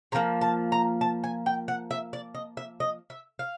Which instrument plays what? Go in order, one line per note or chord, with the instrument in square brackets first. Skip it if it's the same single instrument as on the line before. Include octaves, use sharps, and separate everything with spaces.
[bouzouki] C3 F3 A#3 A#5
A5
A#5
A5
G#5
G5
F#5
E5
D5
D#5
E5
D#5
E5
F5